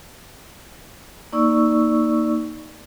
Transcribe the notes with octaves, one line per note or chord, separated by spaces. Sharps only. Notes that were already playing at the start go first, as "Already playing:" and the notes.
A#3 D#4 D5 C#6 E6